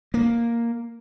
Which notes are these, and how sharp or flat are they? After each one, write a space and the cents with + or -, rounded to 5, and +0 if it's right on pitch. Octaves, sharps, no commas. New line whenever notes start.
A#3 +0